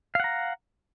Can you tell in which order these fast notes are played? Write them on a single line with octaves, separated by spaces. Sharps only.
F5 F#5 A#5